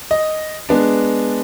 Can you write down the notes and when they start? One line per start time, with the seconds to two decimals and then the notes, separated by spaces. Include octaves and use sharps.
0.11 D#5
0.69 G#3 B3 D4